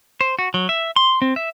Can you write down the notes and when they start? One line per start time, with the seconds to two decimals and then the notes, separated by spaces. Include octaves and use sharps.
0.21 C5
0.39 F#4
0.54 F#3
0.69 E5
0.96 C6
1.22 C4
1.36 E5